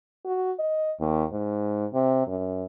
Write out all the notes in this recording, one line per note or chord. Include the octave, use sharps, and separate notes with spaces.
F#4
D#5
D#2
G#2
C3
F#2